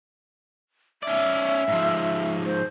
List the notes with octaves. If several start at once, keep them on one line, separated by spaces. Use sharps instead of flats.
C#4 D5 E5
G#2 F3
C5